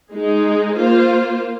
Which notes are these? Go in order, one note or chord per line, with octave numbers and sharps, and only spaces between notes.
G#3 D#4 G#4
A#3 F4 C5